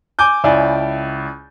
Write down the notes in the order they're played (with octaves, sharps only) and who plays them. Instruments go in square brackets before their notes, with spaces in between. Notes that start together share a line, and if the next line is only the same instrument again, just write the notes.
[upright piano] G#5 D6 G6
C#2 E4 D5 G#5